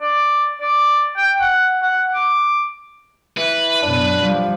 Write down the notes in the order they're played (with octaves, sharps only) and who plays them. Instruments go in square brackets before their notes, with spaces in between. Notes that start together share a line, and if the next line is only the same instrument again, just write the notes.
[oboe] D5
D5
G5
F#5
F#5
D6
[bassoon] E3 [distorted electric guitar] B4
[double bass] F#2 B2 [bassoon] D4
[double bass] F3 G3